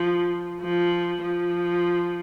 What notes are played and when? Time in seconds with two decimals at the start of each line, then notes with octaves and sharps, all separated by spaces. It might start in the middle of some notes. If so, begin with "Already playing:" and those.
Already playing: F3
0.61 F3
1.23 F3